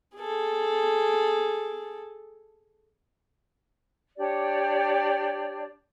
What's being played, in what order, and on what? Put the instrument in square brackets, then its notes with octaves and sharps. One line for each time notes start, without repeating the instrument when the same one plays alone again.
[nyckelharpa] G#4 A4
[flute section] D4 G4 C#5 D5